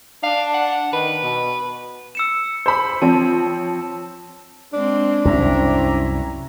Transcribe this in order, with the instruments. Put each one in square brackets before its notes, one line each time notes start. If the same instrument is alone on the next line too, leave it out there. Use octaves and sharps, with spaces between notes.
[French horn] D4 [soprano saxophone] F5
[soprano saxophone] F#5
[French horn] D#3 [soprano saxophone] B4
[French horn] B2
[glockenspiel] E6 C#7 E7
[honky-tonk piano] C5 B5
[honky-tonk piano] F3 C4 C#5 [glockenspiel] A5
[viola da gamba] G#3 C4 [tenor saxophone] D4
[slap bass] C2 F#2 [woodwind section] C4 E5 A#5 [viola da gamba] C#4 E4